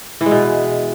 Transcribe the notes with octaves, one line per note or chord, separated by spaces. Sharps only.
E3
G#3
B2